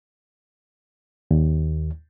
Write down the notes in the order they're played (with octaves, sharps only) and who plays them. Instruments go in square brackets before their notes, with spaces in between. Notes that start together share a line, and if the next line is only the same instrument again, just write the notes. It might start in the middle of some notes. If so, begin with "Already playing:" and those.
[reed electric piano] D#2